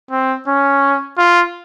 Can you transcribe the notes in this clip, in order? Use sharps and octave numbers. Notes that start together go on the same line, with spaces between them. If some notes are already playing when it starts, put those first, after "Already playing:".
C4
C#4
F4